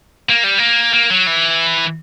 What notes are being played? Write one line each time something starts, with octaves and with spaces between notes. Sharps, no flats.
A#3
G3
A#3
A#3
F#3
E3